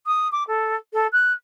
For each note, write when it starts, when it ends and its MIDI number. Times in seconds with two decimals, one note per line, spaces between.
0.06 0.28 87
0.32 0.43 86
0.47 0.75 69
0.93 1.07 69
1.12 1.32 90